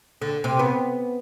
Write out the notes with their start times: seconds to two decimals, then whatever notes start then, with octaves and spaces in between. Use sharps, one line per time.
0.22 D3
0.44 C3
0.59 B3